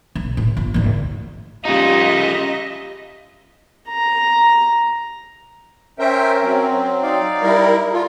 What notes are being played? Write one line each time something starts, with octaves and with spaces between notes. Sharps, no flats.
B1
A2
G1
G#1 D2
C#3 G3 D#4 F4 G4 D#5 E5
A#5
C#4 A#4 C5 E5 G5
F#3 C4
D#4 D5 F5
G3 E4 A#4
F4 A4